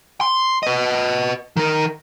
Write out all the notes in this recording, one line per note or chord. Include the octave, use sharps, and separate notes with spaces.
C6
B4 D#5
D#3 A#4